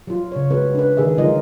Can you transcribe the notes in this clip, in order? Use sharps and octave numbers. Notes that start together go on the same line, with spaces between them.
F#3 F4
C#3 C#5
G#3 C#4 F#4 B4
D4 B4
D#3 G#4 E5
D3 F#3 G#3 D#4 F4 D#5